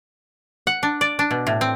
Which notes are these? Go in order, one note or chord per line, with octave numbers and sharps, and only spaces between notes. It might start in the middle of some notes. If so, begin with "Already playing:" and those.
F#5
D4
D5
D4
B2
A2
C4